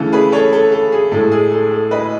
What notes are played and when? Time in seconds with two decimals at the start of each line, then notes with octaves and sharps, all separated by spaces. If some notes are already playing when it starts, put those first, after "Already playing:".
Already playing: C#3 E3 A3 A4
0.12 G#4 B4
0.32 A4 C#5
0.53 A4
0.72 A4
0.92 G#4
1.12 A2 G#3 A4
1.32 G#4
1.52 A4
1.71 A4
1.91 B4 D#5